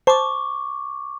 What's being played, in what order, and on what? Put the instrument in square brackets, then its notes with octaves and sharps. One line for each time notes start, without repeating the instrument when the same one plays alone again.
[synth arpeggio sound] C5 A5 [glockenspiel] C#6 D6